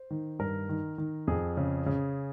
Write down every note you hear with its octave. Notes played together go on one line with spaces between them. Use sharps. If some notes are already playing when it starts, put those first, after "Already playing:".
Already playing: C5
D#3
G2 A#4
D#3
D#3
F2 G#4
C#3
C#3